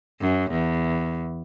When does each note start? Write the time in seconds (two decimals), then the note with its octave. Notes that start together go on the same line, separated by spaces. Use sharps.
0.20 F#2
0.51 E2